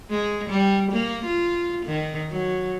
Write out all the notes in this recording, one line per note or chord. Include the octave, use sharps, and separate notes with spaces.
G#3
G3
A#3
F4
D#3
F#3